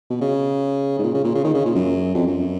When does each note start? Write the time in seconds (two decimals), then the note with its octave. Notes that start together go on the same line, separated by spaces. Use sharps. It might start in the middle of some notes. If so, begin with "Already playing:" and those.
0.10 B2
0.21 C#3
0.99 G#2
1.03 A#2
1.14 C#3
1.24 A#2
1.35 C#3
1.44 D#3
1.54 C#3
1.65 A#2
1.75 F#2
2.14 F2
2.27 F#2